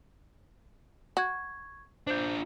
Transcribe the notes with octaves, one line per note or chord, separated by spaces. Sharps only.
F#4 C#6 G#6
D4 F4 C5 G6